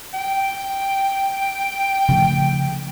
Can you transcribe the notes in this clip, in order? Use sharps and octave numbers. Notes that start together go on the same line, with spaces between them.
G5
C#3 F3 A3